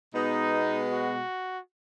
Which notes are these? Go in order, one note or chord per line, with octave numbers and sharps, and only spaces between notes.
B2 G#3 B3 D#4
F#4